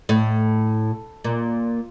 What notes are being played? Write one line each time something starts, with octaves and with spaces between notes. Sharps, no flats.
A2
A#2